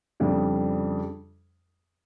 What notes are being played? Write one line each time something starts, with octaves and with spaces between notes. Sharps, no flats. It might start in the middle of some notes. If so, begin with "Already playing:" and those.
F2 C#3 G3 D4